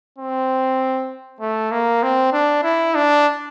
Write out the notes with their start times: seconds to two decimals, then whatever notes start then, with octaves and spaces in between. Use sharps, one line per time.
0.18 C4
1.41 A3
1.71 A#3
2.03 C4
2.33 D4
2.63 E4
2.95 D4